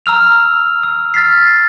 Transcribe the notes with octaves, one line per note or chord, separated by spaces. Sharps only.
A#5 E6 F6 F7
E6
F6 A6 B6 C7